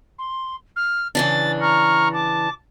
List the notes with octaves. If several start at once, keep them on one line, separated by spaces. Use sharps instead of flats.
C6
F6
C#3 E3 D4 A6
A#5 C#6 F6
A5 D6